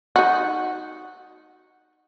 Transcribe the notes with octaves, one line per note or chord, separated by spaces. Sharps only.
D#4 F#4